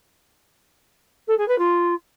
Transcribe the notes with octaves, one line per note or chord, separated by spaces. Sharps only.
A4
G#4
B4
F4